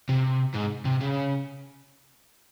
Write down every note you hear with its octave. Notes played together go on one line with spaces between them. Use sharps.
C3
G#2
C3
C#3